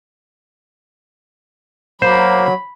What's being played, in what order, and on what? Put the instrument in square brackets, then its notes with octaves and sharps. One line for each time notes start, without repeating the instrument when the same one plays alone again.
[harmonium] F#3 [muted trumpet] A#3 [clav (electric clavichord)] C5 [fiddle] B5